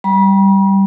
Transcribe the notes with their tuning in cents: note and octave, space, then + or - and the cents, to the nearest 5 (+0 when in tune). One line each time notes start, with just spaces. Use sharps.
G3 +0 B5 -45